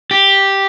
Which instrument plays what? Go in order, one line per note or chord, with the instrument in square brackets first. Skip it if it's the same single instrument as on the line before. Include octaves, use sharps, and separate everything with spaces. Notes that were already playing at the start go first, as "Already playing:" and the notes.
[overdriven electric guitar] G4